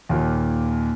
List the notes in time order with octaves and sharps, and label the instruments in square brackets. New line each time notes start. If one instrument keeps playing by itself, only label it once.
[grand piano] D#2 A#2